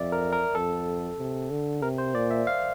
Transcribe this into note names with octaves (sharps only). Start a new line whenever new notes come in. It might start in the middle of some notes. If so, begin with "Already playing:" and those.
Already playing: F2 D5 E5
A#4
A#4
F2 A4
C3
D3
C3 A#4
C5
A#2 D5
E5
F5